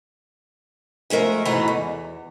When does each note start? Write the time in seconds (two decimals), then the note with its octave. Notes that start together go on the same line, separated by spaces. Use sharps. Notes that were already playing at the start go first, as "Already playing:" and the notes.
1.10 F3 G#3 A3 A#4
1.45 G#2 B2 E3 A3 B3 A#5
1.68 E2